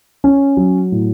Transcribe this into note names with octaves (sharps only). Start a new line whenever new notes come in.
C#4
F#3
A2